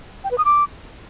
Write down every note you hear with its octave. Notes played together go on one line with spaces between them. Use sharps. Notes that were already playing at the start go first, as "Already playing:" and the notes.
G5
B4
D#6
D6